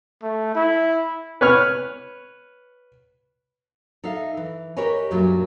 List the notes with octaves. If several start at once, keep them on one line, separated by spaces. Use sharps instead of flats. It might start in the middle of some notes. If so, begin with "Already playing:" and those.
A3
E4
B4 C#5 F6
D#4 A4 E5 F5
E3
G4 A#4 B4 C#5 D#5 G#5
F#2 A#2 F#3 G3 A3 D4